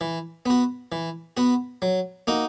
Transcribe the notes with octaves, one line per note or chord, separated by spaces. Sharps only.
E3
B3 F#4
E3
B3 F#4
F#3
A#3 D#4 F#4